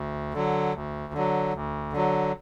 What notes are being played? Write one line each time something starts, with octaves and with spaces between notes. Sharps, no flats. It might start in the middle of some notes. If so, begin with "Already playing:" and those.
Already playing: D2
D3 F#3
D2
D3 F#3
D2
D3 F#3